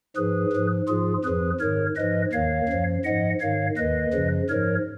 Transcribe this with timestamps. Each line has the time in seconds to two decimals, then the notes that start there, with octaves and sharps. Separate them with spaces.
0.16 G#2 F3 G#4 B4
0.52 G#2 F3
0.88 G#2 F3 F4 G#4
1.24 F2 F3 G#4 B4
1.60 G#2 D#3 A#4 C#5
1.96 G#2 F3 B4 D#5
2.32 D#2 D#3 C#5 F5
2.68 F#2 F3
3.05 G#2 F3 D#5 F#5
3.40 G#2 D#3 C#5 F5
3.77 D#2 D#3 B4 D#5
4.13 F#2 C#3 F3
4.49 G#2 F3 A#4 C#5